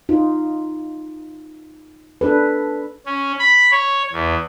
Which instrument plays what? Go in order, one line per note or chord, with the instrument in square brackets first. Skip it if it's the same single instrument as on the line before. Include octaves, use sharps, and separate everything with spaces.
[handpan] D#4 F4
D4 A4 B4
[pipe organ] C#4
B5
C#5
E2